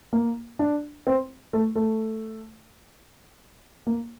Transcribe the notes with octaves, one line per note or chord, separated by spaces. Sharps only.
A#3
D4
C4
A3
A3
A#3